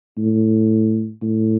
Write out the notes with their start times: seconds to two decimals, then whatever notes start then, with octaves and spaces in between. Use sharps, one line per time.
0.18 A2
1.22 A2